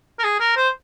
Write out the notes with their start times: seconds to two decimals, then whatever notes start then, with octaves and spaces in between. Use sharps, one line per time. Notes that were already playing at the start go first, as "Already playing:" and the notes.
0.19 A#4
0.24 G#4
0.40 A#4
0.57 C5